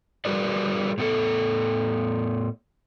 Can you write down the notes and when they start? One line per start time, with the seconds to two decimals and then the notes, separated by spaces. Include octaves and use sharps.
0.25 G3 F#4 G#4 A#4 B4 D5
0.98 A2 B3 A4